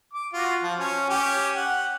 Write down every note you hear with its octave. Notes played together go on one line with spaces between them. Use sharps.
D6
F4 F#4
F3
C#4
C#4 G4
F#5